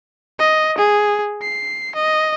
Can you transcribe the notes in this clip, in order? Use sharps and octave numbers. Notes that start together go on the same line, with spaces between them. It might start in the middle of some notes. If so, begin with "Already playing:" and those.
D#5
G#4
C7
D#5